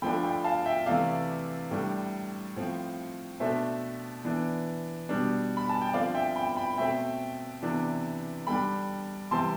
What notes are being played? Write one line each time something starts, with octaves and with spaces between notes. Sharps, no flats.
D3 F3 A3 D4 G5 B5
G5 B5
F5 A5
E5 G5
C3 E3 A3 D5 F5
A2 G3 D4
A2 F3 C4
B2 A3 D4 C5 E5
E3 B3 D4
B2 G3 D4
B5
A5
G5
D3 F3 C4 D5 F5
E5 G5
G5 B5
G5 B5
B2 A3 C4 E5 G5
C3 E3 B3 D4
D3 G3 D4 G5 B5
C3 E3 G3 C4 A5 C6